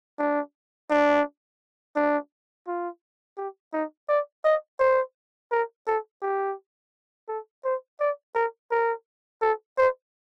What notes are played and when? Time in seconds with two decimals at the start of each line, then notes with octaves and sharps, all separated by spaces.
0.19 D4
0.90 D4
1.96 D4
2.67 F4
3.37 G4
3.73 D#4
4.09 D5
4.44 D#5
4.80 C5
5.51 A#4
5.87 A4
6.22 G4
7.28 A4
7.64 C5
8.00 D5
8.35 A#4
8.71 A#4
9.42 A4
9.78 C5